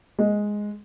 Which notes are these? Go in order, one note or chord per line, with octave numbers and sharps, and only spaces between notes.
G#3